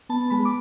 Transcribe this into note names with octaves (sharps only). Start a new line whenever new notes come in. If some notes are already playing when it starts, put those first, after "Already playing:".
B3 A5
G#3 B5
D6